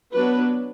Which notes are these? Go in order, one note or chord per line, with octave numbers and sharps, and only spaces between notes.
F#3 B3 D4 B4